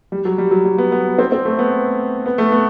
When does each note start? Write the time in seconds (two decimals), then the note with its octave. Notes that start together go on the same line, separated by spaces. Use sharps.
0.12 G3
0.25 F#3
0.38 G3
0.51 F#3
0.65 G3
0.78 B3
0.92 B3
1.19 C4
1.32 C4
1.45 A3
1.59 B3
2.26 B3
2.38 A3
2.52 B3